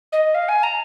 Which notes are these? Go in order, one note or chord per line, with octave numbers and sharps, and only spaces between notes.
D#5
F5
G#5
A#5